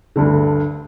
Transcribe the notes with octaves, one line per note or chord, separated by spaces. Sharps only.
D2 G2 D3